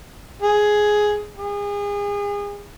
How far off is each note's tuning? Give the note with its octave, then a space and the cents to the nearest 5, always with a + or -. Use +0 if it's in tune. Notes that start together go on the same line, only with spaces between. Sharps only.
G#4 +10
G#4 -35